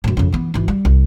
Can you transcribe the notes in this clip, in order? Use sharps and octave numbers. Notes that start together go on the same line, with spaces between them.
F#2 A2
F2 C#3
E3 B3
G#1 E3
G3
C2